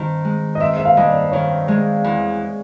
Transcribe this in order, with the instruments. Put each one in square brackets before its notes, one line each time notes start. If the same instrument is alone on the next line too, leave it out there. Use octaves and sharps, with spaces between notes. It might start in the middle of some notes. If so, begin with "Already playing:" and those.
Already playing: [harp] G2 D#3 C4
G#3
[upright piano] D#5
[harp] C4 [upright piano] E5
[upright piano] E5
F5
[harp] G2 [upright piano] D#5
[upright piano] D5
[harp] D#3 [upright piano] C#5
[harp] G#3
E2